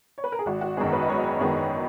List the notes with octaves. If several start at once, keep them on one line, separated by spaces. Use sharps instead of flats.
C#5
B4
A#4
G#4
G#1 F#4
F#4
F#2 D#3 G#3 B3 G#4
B4
D#5
G#1 C#5
F#2 D#3 G#3 B3